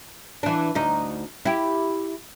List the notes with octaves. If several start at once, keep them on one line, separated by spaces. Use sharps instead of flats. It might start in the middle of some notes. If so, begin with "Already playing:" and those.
E3 D4
D2 D#4
E4 G4